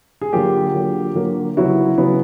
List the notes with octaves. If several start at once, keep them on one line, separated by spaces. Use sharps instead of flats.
G#4
D3 F#3 A#3 F4 G4
D3 F#3 A#3
D3 F#3 A#3
C#3 F#3 B3 E4 F#4
C#3 F#3 B3